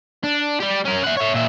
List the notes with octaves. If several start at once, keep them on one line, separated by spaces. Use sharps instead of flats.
D4
G3 G4
C#4 A#4
E5 F#5
C#5 E5
A#2 E5